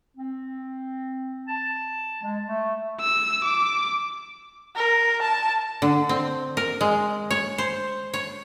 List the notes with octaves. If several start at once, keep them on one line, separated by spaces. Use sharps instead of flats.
C4
A5
G#3
A3
E6
D6
A#4
A5
D3
C4
A#4
G#3
C#5
C5
C#5